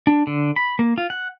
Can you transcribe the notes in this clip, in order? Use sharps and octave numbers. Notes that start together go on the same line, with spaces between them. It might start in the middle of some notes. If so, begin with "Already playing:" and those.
D4
D3
B5
A#3
F4
F#5